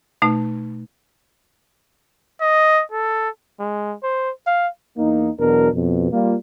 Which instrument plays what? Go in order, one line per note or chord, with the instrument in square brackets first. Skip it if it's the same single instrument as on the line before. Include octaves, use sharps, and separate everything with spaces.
[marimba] B2 A3 D#4
[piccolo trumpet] D#5
A4
[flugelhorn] G#3
C5
F5
[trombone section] E2 A#3 D#4
E2 B2 F#3 D4 A#4
F2 B2
G3 A#3 F4